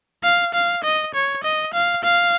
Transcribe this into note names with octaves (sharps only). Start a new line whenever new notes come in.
F5
F5
D#5
C#5
D#5
F5
F5